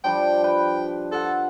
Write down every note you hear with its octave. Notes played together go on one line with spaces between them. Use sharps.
F3 G3 D4 G5
B4 G5
F4 A4 F#5